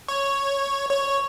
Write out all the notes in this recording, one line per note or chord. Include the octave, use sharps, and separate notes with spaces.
C#5
C#5